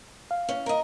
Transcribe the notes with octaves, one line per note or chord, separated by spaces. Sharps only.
F5
C#4
A#4 D#5